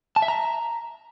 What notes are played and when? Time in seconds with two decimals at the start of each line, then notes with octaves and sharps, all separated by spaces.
0.16 A5
0.22 E5
0.28 A#5